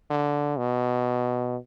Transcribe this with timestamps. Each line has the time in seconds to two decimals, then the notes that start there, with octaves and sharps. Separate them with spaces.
0.10 D3
0.58 B2